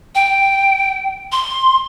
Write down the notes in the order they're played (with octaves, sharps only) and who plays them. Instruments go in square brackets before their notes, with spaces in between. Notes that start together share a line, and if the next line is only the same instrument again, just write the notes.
[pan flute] G5
C6